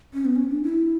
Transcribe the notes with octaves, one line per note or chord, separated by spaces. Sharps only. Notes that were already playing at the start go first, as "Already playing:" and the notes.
C#4
B3
C#4
D4
E4